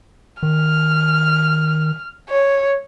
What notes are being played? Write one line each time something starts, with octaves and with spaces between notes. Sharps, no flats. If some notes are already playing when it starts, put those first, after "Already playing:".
D#3 F6
C#5